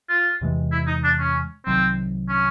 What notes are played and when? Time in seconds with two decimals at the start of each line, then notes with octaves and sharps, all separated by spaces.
0.09 F4
0.41 E2 C3 E3 G#3
0.72 E4
0.87 D#4
1.04 D4
1.19 C#4
1.66 C2 C3 D#3 F#3 C4
2.29 C#4